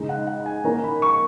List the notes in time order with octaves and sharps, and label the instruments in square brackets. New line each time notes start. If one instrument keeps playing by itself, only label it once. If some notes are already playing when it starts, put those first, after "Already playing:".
Already playing: [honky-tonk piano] C#3 G#3 D#4
[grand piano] F#5
F#5
G#5
[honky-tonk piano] D#3 A#3 C#4 [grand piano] A#5
[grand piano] B5
C#6